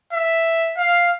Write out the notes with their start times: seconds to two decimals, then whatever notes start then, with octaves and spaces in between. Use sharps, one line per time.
0.13 E5
0.77 F5